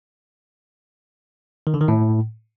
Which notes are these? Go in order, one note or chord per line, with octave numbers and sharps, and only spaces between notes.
D#3
D3
D#3
A2